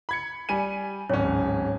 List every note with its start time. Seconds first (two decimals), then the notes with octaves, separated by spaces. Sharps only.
0.09 B5 G#6 C#7
0.49 G3 G#5 D#7
1.10 D1 G#1 C#4 C#5